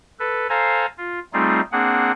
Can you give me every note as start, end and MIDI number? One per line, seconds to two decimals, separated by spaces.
0.20 0.47 69
0.20 0.47 71
0.49 0.86 69
0.49 0.86 72
0.49 0.86 77
0.49 0.86 80
0.49 0.86 82
0.98 1.20 65
1.33 1.61 55
1.33 1.61 57
1.33 1.61 60
1.33 1.61 63
1.33 1.61 65
1.33 1.61 68
1.72 2.12 58
1.72 2.12 60
1.72 2.12 62
1.72 2.12 68
1.72 2.12 78